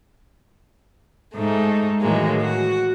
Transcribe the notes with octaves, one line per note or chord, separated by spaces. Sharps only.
G#2 A3 D#4
A2 D#3 E3 F#3 G#3 A#3
F#4